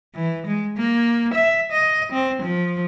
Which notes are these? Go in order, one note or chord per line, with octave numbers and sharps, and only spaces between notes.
E3
G#3
A#3
E5
D#5
C4
F3